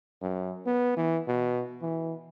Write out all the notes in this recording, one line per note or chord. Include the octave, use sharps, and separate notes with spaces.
F#2
B3
E3
B2
E3